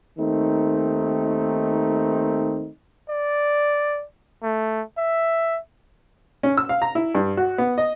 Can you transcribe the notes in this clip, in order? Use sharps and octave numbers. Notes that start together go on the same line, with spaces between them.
D#2 D#3 A3 C4 D#4
D5
A3
E5
C#4
E6
F5
A#5
E4
G2
F#4
B3
D#5